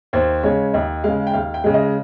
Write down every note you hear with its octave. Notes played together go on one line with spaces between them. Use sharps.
D#2 C5
C#3 G#3 C#5
D#2 D#5
C#3 G#3 F5
G5
D#2 F5
G5
C#3 G#3
D#5